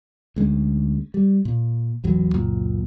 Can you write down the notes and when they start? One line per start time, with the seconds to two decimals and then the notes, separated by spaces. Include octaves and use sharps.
0.36 D2 G#3 C#4
1.14 G3
1.45 A#2
2.04 A1 E2 F#3
2.34 C#2 F#2 A#2